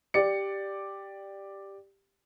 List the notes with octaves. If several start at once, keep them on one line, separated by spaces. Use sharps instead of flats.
G4 D5 C#7